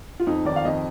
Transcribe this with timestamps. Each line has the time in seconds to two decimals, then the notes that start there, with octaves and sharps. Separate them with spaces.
0.20 F4
0.27 F2 D#4
0.45 D#3 D5
0.56 F5
0.65 F2 D#5